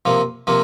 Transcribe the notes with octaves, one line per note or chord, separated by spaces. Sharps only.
C3 F3 A#3
C3 F3 A#3